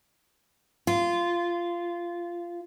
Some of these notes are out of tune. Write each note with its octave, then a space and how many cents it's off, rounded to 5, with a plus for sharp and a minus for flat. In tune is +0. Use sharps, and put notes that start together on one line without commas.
F4 -15